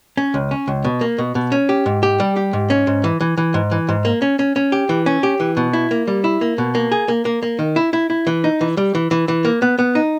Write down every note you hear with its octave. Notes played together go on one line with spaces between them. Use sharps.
C#4
C#2
C#4
C#2
B2
A#3
B2
B2
C#4
G4
G#2
G4
G3
G4
G#2
C#4
G#2
E3
E3
E3
G#2
E3
G#2
A#3
C#4
C#4
C#4
G4
E3
C#4
G4
E3
B2
E4
A#3
G3
E4
A#3
B2
A#3
G#4
A#3
A#3
A#3
D#3
E4
E4
E4
E3
D#4
E3
G3
E3
E3
E3
A#3
B3
B3
D#4